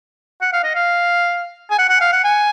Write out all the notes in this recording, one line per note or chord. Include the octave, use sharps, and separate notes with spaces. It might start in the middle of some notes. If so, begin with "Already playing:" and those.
F#5
F5
D#5
F5
G#5
F#5
F#5
F5
F#5
G#5